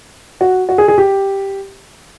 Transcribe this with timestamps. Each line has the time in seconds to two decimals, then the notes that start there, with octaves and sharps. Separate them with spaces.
0.41 F#4
0.69 F#4
0.78 G#4
0.88 G#4
0.98 G4